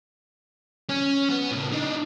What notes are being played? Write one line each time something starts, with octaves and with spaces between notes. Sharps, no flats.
C#4
B3
A2 C#3
D4 D#4